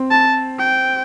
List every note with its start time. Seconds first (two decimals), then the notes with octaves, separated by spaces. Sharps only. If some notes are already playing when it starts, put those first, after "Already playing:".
Already playing: C4
0.11 A5
0.59 G5